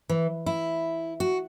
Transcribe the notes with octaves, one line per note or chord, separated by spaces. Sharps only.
E3
E4
F#4